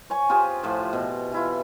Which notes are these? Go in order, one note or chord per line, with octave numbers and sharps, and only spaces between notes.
C#5 G#5 C#6
F4 G4 G#4 C5
A2 F3 C5
B2
E3 E4 F4